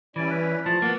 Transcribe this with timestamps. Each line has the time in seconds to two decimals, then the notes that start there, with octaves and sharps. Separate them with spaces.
0.16 E3 G3 C#4 E4 D5
0.30 B4
0.66 F3 A3 A5
0.82 A#3 B3 F#5